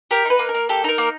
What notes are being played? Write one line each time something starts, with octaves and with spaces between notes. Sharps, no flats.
G4 A#4
D#4 B4
A#3
A#4
A#3
G4 A4
D#4 A#4
A#3